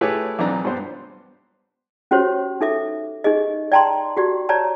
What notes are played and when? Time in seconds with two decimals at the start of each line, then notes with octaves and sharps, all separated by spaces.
0.01 A3 E4 G4 G#4 B4 C#5
0.39 B1 E3 C4 D4 A#5
0.65 G2 B3 C5
2.11 C#4 F#4 G4 C5 C#5
2.61 D#4 A4 E5 D6
3.24 D#4 G4 G#4 D#5
3.72 D5 G5 A5 A#5 C6
4.17 F#4 G4 D5
4.49 C#5 D5 A5 A#5